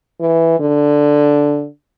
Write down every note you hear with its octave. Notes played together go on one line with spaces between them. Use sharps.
E3
D3